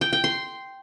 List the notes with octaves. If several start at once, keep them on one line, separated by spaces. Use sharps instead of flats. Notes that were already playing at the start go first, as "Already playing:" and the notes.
G5
G5
C6